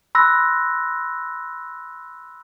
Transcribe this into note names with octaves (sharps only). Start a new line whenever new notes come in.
B5 C6 E6 F#6 A#6